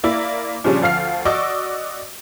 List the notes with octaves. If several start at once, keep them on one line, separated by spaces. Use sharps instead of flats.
A#3 E4 D5
A#2 C#3 F3 G3 C#4 D4
D2 F3 F5 F6 C7
F#4 D5 D#5 C#6 D6 E6